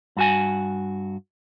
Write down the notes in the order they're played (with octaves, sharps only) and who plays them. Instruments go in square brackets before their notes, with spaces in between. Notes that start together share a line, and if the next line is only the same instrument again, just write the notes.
[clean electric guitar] G2 F#4 G#5